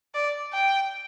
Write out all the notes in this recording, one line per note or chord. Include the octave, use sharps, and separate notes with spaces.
D5
G5